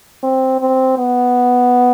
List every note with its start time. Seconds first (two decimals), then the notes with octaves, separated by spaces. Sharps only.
0.23 C4
0.61 C4
0.98 B3